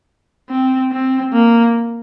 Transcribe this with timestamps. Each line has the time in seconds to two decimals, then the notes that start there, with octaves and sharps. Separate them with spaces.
0.50 C4
0.92 C4
1.33 A#3